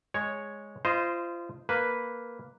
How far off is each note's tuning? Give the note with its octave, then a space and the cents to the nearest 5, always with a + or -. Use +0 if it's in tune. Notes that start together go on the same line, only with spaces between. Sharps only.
G#3 +0 C#5 +0
F4 -25 C5 -10 D#5 +0
A#3 +0 B4 +0